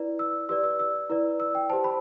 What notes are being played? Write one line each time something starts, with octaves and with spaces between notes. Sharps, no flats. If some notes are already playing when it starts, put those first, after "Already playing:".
Already playing: E4 B4 D5
E6
G4 B4 D5 E6
E6
E6
E4 B4 D5
E6
G5
G4 C5 A5
B5